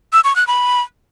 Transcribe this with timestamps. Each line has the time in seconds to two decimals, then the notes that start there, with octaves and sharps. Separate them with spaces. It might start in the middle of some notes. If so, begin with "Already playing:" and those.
0.13 E6
0.24 C#6
0.36 F#6
0.47 B5